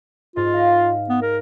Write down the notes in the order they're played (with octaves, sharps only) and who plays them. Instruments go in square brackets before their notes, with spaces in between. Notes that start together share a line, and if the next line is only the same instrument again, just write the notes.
[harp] G#2 C5 D#5 [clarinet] F4
[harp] F5 F6 A#6
[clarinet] B3
[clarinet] A#4 [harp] A#6